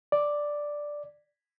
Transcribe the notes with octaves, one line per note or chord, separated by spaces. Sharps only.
D5